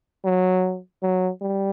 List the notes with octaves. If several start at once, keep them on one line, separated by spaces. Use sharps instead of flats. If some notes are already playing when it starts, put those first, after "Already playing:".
F#3
F#3
G3